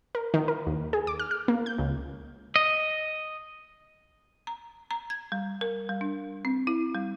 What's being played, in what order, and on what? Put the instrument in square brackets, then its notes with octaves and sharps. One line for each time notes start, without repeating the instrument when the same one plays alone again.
[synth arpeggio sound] A#4
D#3
A#4
D#2
G#4
D6
F6
F6
A#3
G6
C#2
[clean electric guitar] D#5
[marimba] A#5
A#5
G#6
G3
A#4
G3
D4
C4
E4
G3